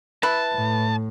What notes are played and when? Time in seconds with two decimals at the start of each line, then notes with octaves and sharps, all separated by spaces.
0.23 E4 B4 A5
0.54 A2